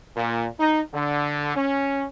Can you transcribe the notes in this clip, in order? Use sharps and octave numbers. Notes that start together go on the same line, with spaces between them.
A#2
D#4
D3
C#4